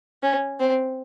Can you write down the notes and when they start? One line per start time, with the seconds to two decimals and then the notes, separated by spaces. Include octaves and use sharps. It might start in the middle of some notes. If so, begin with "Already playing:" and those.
0.23 C#4
0.60 C4